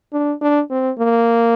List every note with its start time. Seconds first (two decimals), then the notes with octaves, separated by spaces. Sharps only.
0.13 D4
0.41 D4
0.71 C4
0.99 A#3